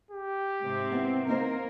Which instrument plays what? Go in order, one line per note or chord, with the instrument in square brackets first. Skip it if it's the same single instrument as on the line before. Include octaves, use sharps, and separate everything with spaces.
[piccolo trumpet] G4
[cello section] G#2 C3 C4
[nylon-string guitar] B3 E4
[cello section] A#3 A#4 [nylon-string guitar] C4 D#4 C5